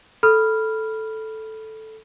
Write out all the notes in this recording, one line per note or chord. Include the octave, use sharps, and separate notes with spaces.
A4 B5 F6